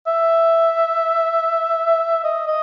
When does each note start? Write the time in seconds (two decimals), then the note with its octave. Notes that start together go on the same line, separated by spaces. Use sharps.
0.07 E5
2.24 D#5
2.47 D#5